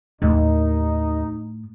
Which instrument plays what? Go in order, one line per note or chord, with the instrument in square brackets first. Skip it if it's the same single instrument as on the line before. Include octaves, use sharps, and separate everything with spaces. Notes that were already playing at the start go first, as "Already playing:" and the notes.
[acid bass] D#2 [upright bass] A2 [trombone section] D#4